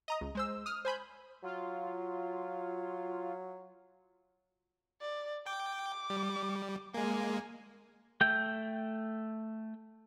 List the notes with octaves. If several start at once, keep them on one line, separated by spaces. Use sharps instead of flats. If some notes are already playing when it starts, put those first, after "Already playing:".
D#5 A#5 D#6
C#2
G#3 C5 E6
D#6 F6
C5 G#5 B5 G6
F#3 F4
D5
G5 D6
G3
G#3 A#3 G#5
A3 G5 G6